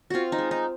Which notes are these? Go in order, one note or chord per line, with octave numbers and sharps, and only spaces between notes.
C4 F4 F#4
D#4
G#3
D#4